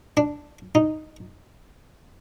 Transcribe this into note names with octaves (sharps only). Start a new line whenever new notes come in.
D4
D#4